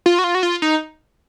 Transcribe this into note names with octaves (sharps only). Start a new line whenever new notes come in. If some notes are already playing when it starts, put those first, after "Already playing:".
F4
F#4
F4
F#4
F4
D#4